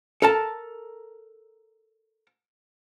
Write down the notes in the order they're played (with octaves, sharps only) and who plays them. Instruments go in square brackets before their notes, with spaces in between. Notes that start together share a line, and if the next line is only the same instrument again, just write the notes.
[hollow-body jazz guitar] A4 A#4 A5